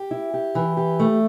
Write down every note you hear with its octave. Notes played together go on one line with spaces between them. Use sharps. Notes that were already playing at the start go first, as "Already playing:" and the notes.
Already playing: G4
E4
G4
E3
G4
A3